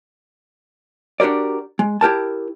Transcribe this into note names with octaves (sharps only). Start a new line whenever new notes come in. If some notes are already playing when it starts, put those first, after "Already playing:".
D4 F#4 G4 A#4 D5
G#3
E4 G4 A#4 A5